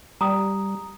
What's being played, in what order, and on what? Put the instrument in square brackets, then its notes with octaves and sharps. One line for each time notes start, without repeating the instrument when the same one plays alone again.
[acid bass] G3 [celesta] A#5 D#6